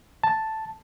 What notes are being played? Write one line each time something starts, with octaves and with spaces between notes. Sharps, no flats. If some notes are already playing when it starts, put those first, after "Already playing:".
A5